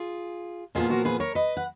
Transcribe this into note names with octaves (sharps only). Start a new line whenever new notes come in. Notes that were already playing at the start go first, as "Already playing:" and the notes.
Already playing: F4 G#4
A#2 F3 B3 F4 G#4
F#4 A#4
G#4 B4
A#4 C#5
B4 D#5
F#5